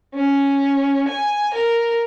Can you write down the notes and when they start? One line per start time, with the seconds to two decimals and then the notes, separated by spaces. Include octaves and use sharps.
0.15 C#4
1.08 G#5
1.54 A#4